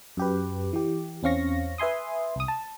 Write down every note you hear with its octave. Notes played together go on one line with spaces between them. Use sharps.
F#2 G4 B4
E3 G4
E2 C4 C#4 F5 C#6 A#6
B4 E5 G#5 C6 D#6
C2 D#6
A5